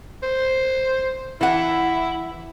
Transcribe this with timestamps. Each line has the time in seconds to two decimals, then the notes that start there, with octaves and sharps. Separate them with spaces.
0.22 C5
1.41 E3 E4 F#5